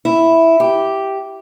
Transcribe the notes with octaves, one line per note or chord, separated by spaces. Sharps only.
E4
G4